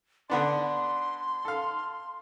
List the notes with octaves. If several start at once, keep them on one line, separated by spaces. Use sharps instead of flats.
D3 B3 D4 C6
A4 F5